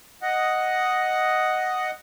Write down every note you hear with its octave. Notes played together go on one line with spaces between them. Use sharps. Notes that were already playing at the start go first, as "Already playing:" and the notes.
D#5 F#5